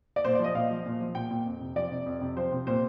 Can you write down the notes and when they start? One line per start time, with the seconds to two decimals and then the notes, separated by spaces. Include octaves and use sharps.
0.16 D5
0.25 A#2 C5
0.35 D5
0.39 F3
0.44 D#5
0.55 A#2 F5
0.70 F3
0.86 A#2
1.00 F3
1.15 A#2 G5
1.31 A#2
1.46 F2
1.60 C3
1.76 F3 D5
1.92 C3
2.06 F2
2.21 C3
2.37 F3 C5
2.52 C3
2.67 A#2 C5